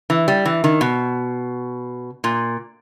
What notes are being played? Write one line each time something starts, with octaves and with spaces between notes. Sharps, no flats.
E3
G3
E3
D#3
B2
A#2